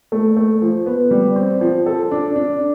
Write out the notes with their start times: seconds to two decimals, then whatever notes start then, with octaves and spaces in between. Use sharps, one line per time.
0.12 A3
0.37 A3
0.62 F3
0.86 B3
1.11 G3
1.36 C4
1.61 F3
1.86 A4
2.11 D4
2.36 D4